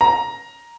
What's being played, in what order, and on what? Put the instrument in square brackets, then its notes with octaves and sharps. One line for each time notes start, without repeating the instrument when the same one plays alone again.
[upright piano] A#5